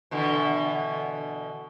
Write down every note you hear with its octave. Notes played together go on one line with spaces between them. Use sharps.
B2 D3 E3